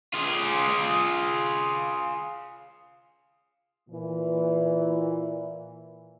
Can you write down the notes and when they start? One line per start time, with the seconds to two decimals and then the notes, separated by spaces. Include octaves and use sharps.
0.14 F4 G#4
3.90 A#2 E3